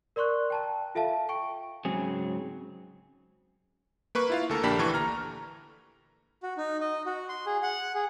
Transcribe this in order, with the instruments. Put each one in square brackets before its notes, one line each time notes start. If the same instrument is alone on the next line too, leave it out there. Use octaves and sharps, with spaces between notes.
[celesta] A#4 D5 C6 C#6 F#6
G5 A5 A#5
F4 A4 E5 F5 A5
G5 C#6 D7
[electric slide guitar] G#2 C#3 F#3 C4 G#4
[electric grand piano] A#3 B4 C#6
E4 F4 F5
D2 A4 A#4
A#1 A#3 D4 G4 A5 B5
D2 E3 A4 C#6
A#5 F6
[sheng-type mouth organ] F#4
D#4
D#5
F#4
C6
G#4
F#5
G#4